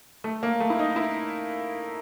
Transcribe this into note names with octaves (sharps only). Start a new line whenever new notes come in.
A3
A#3
A3
E4
D#4
E4